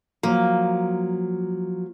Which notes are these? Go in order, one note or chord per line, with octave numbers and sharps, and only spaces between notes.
F3 F#3 A#3